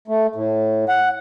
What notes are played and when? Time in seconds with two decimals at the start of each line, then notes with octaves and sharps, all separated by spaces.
0.08 A3
0.35 A2
0.89 F#5